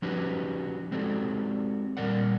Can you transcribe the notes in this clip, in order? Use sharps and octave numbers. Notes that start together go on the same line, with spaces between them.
F3 C#4 D#4 F#4 G4 B4
G#3 C4 F#4 G4 A4 D5
A#2 E3 G3 A#4 D5 F#5